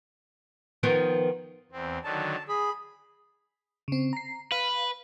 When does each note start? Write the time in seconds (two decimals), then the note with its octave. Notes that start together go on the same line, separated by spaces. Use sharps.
0.83 D#3 F3 B3
1.72 E2 C4
2.04 D3 D#3 F#3 A5
2.48 G#4 B5
3.88 C#3 C4
4.13 A#5 C7
4.52 B4 F5